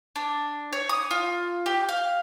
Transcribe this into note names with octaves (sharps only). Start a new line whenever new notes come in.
D4
C#5
D#6
F4
G4
F5